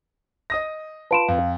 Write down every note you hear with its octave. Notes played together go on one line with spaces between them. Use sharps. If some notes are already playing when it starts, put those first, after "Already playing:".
D#5 D#6 A#6
F4 B4 A5 D7 E7
F2 F5